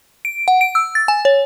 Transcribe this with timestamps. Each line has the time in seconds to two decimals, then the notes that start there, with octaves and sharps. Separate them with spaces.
0.25 D7
0.48 F#5
0.61 D7
0.75 E6
0.95 A6
1.08 G#5
1.25 C#5